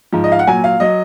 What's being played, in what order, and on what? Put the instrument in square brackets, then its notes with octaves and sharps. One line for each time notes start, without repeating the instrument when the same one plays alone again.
[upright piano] G#2 F3
D#5
F5
F#5
A#2 F#3 G#5
F5
F#3 D#5